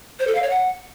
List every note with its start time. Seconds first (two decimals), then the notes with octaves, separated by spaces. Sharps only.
0.20 C5
0.27 A4
0.35 F5
0.42 C#5
0.50 F#5